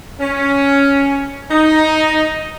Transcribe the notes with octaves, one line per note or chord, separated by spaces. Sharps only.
C#4
D#4